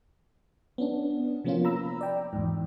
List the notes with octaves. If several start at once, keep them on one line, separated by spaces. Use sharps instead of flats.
B3 C#4 D4
C3 F3 A#3 B3 C#4 F4
A#5 B5 E6
D5 G5
E2 G#2